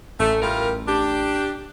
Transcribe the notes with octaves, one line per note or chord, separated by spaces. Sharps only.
A1 A3
G3 F4 A#4
D4 G4